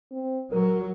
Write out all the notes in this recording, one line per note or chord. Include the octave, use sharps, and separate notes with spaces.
C4
F#3 A#4